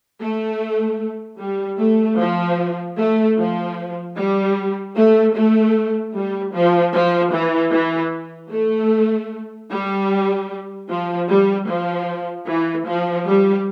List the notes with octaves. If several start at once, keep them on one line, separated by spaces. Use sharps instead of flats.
A3
G3
A3
F3
A3
F3
G3
A3
A3
G3
F3
F3
E3
E3
A3
G3
F3
G3
F3
E3
F3
G3